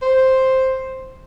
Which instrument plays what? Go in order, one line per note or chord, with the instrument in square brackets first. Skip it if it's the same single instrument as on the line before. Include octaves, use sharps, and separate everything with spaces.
[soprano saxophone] C5